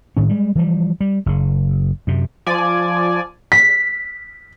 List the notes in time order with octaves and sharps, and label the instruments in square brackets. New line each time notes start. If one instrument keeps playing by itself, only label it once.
[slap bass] A2 D#3 C#4
G3 G#3
E3 F3 G3
G3
F#1 C#3
F#2 C3
[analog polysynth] F3 D5 G#5
[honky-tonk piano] B6